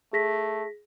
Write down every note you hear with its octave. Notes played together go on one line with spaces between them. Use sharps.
A3 G#4 A#6 B6